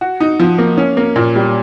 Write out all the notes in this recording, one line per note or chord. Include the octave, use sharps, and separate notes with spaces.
F#4
D#4
F3
A#3
C#4
A#3
A#2
G3